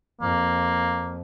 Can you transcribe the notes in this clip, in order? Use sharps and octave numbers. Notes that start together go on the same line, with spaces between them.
F2 A#3